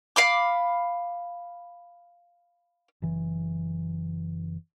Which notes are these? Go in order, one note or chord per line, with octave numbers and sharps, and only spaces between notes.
F5 B5 D6
F#1 E3